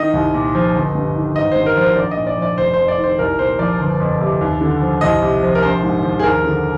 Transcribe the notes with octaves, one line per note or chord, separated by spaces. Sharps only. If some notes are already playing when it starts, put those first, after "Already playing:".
Already playing: D#3 D#5
C2
A#2
F3
G1
G2
D#3
G#1 D#5
G2 C5
A#4
F3
C5
A#1 D5
D#5
A#2
D5
F3 D5
F1 C5
F2 C5
D5
D#3
C5
C2 A#4
A#2 C5
F3 D5
G1
F2
C3
D#2
D3
F3
C2 D#5
C3
F3
A#4
A#1 C5
G#2
F3
G#4
D#2 A#4
D3